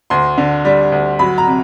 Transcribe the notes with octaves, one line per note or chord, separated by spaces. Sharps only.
D2 C6
D3
G3
D2
F#3 B5
A#5
C3